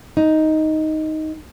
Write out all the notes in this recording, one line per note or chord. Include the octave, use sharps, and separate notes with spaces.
D#4